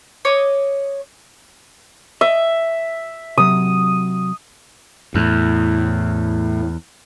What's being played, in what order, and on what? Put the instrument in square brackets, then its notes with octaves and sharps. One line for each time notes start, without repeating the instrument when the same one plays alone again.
[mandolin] C#5 D#5 D6
[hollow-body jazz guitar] D#5 [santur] E5
[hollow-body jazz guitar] C3 F#3 [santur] D#6
[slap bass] E2 [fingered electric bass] A2